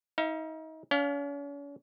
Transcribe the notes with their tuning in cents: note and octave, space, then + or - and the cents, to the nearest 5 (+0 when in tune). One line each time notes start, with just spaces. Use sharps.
D#4 +35 F5 -30
C#4 +40 F5 +10